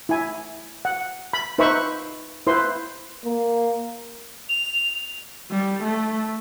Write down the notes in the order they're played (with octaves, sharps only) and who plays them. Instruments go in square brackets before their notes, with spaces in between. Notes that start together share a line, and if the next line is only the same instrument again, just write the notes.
[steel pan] E4 G#5
F#5
B5
D#4 B4 C5 E5 B5 C#6
E4 B4 C5 C6
[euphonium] A#3
[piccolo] F7
[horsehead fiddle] G3
A3